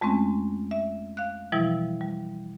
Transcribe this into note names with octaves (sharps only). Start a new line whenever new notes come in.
F2 G#3 A3 C4 C#4
E5
F5 F#6
B2 E3 F3 G3 E4
G3